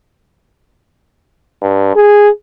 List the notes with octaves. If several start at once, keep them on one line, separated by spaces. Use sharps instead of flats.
G2
G#4